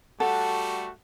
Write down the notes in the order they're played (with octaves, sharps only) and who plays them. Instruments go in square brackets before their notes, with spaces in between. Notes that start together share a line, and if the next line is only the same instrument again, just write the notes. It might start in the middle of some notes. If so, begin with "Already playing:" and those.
[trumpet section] G3 A3 F#4 [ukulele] A4 [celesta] F#5